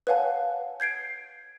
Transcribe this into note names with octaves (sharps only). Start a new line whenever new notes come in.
B4 C#5 F5 F#5 G#5 A5
G6 G#6 C7 D7